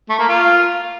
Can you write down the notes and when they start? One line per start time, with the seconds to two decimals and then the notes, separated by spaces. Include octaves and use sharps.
0.09 A3
0.19 A#3
0.28 F4